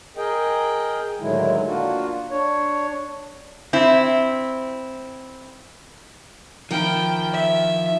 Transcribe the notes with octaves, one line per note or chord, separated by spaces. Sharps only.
G#4 A#4 D#5 G5
A2 D3 D#3 F#3 G#3 E4
A#3 D4 F4 F#4
D4 C#5
C4 E4
D#3 F3 E4 G5
E5